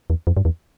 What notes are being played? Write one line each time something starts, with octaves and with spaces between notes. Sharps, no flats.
E2
F2
G2
E2